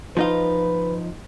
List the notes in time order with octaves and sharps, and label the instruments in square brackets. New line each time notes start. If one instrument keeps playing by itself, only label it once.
[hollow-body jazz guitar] F3 D#4 F4 [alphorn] B4